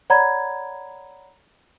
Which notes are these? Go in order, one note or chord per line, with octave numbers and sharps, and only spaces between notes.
C#5 D5 F#5 A#5 B5 G#6